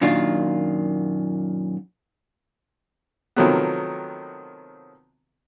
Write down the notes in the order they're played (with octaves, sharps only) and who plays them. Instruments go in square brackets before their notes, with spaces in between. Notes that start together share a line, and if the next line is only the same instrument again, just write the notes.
[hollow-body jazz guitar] F#2 A#2 D#3 D4 F4
[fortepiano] C3 D#3 F3 F#3 A3 B3